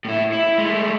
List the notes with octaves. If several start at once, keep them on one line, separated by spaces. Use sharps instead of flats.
A2 E4
E4
G#3 A3